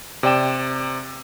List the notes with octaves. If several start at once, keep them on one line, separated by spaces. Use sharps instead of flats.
C3 D5 G5 E7